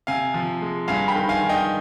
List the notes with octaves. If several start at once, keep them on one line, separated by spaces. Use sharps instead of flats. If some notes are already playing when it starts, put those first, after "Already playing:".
C3 F5 G#5
F3
G#3
G2 F5 G#5
G5 B5
D#3
F5 G#5
D#3
D#5 G5